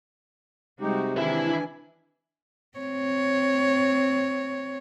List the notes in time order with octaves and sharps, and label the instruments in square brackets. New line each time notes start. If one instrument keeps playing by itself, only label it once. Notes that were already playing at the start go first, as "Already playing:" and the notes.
[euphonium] C3 [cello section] G3 G#3 F#4 [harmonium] D#4 G4
[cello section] D#3 D4 [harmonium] E3 G#5 [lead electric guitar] E4 E5
[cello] C4 C#5